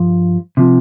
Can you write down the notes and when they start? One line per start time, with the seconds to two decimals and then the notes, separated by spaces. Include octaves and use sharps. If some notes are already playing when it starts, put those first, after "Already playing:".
Already playing: G2 F3
0.57 C3 F3